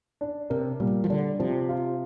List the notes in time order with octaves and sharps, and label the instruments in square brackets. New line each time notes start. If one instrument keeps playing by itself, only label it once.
[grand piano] D4
[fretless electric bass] C3 [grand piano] A#4
[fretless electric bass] A#2 [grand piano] G3
[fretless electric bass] F3
[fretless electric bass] D3 [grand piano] D4
[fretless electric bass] C3 [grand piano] F3
[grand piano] F4